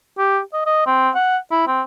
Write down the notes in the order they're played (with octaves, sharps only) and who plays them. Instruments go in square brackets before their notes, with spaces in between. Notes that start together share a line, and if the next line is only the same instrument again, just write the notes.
[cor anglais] G4
D#5
D#5
C4
F#5
E4
C4